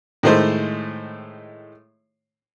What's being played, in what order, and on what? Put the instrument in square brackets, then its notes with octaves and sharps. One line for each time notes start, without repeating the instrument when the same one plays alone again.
[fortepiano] A2 D#3 G#3 A3 C5